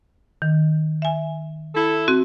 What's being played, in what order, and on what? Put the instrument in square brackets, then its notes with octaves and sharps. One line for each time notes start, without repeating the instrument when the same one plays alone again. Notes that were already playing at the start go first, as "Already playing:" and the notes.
[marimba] D#3
E5 G#5
[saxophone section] E4 A4
[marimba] C4 F#4